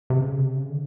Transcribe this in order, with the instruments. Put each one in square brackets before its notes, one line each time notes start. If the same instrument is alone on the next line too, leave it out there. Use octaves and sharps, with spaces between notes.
[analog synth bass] C3
C#3
C3
C#3
D3